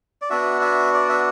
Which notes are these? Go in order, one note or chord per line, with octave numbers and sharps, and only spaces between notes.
D5
B3 D4 F#4 E5
E5
D5
E5